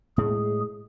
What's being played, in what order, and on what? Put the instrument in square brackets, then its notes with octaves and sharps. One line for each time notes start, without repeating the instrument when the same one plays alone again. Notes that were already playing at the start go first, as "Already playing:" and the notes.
[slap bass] A2 G#3 [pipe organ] G#4